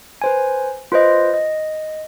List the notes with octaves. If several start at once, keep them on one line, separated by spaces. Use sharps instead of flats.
B4 C5 G#5
F4 B4 C5 D#5
D#5